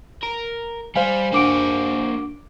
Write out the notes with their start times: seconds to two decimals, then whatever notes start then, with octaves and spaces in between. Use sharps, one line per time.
0.23 A#4
0.96 G3 C5 F5 G#5
1.33 A#3 D4 F#4 D6 D7